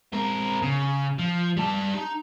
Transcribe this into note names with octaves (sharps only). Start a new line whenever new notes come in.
C4 A#4
C#3
F3
G3 A5
D#4